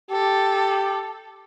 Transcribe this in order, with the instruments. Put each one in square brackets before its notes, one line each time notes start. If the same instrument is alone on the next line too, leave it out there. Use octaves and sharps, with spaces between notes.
[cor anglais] G4 [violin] A4